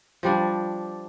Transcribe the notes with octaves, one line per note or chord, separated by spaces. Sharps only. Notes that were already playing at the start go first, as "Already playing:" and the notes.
F3 G3 D4